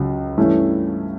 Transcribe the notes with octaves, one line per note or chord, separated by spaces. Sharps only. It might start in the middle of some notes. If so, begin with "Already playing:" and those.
Already playing: C#2 C#3 F#3
G2 E3 A3 C#4 E4